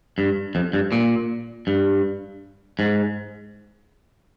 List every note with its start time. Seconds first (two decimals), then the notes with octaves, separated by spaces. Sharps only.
0.18 G2
0.55 F2
0.73 G2
0.92 A#2
1.67 G2
2.79 G#2